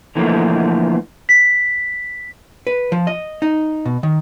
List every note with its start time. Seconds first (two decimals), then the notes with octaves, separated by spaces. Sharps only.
0.15 B2 D3 E3 F3 A3 A#3
1.29 B6
2.67 B4
2.92 F3
3.07 D#5
3.42 D#4
3.85 B2
4.03 D#3